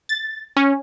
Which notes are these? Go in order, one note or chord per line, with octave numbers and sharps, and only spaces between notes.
A6
C#4